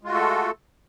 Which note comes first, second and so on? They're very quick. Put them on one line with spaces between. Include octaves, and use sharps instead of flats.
G#3 F4 F#4 A3 A4